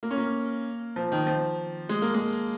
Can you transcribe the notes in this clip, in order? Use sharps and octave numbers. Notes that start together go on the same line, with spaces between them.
A#3
C#4
A#3
F3
D#3
F3
G#3
A#3
G#3